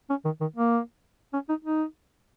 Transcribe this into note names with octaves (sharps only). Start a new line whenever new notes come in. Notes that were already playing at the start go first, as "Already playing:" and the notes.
C#4
D#3
D#3
A#3
C#4
D#4
D#4